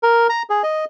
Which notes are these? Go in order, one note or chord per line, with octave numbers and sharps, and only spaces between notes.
A#4
A#5
G#4
D#5